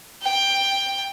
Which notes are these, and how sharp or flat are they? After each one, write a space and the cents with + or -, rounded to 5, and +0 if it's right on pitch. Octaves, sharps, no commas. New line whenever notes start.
G5 +10